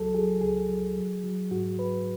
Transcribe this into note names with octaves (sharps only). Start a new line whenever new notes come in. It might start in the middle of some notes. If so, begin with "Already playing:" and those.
Already playing: C#2 F#3 A4
F#3 G#4
C#2 G#4
F#3
F#3
F#3
G#2 F#4
F#3 B4